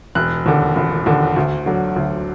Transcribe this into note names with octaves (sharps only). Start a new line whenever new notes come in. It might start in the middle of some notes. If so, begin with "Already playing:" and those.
E1 F#6
D#2 D3
E1
D#2 D3
D2
D3 F#3
D2